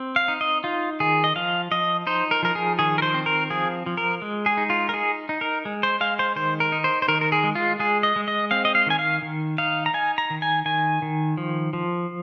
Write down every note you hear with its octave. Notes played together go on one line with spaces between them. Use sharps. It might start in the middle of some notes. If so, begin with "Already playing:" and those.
Already playing: C4
F5
D#4
D#5
D#4 F4
D#3 G#4
D#5
F3 F5
F3 D#5
D#4 C5
A#4
F3 A#4
G#4
D#3 G#4
A#4
C5
C4
A#4
F3 G#4
F3
A#4
G#3
G#4
D#4
F4
A#4
D#4 G#4
D#4
A#4
G#3
C5
G#3 F5
C5
D#3 C5
A#4
D#4
C5
C5
D#3 A#4
A#4
G#4
G#3
F4
G#3 G#4
D#5
G#3
D#5
C4 F5
D#5
F5
D#3 G#5
F5
D#3
D#4 F5
A#5
D#4 G#5
A#5
D#3
G#5
D#3 G#5
D#3
F3
F3